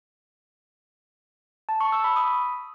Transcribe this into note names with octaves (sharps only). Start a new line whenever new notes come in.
A5
C#6
E6
B5
D#6